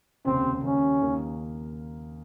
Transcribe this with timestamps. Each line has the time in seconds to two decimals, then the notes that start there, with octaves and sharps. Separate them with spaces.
0.25 F1 D#2 C#3 C4
0.63 D#2 C#3 G3 C#4
1.01 D#2 D#3 A#3